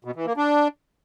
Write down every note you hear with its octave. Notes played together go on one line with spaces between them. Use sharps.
B2
E3
A#3
D4